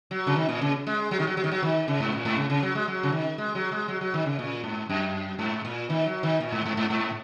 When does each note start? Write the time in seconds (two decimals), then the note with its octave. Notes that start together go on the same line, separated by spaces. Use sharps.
0.11 F#3
0.27 C#3
0.36 D#3
0.49 A#2
0.61 C#3
0.87 G#3
1.11 F#3
1.19 D#3
1.27 F#3
1.37 F#3
1.44 D#3
1.51 F#3
1.62 D#3
1.88 C#3
2.00 G#2
2.12 A#2
2.25 G#2
2.37 C#3
2.50 C#3
2.63 F#3
2.75 G#3
2.88 F#3
3.03 C#3
3.12 D#3
3.38 G#3
3.55 F#3
3.72 G#3
3.88 F#3
4.01 F#3
4.14 D#3
4.26 C#3
4.39 A#2
4.64 G#2
4.89 F#2
5.39 G#2
5.65 A#2
5.90 D#3
6.06 F#3
6.23 D#3
6.40 A#2
6.52 G#2
6.66 G#2
6.77 G#2
6.90 G#2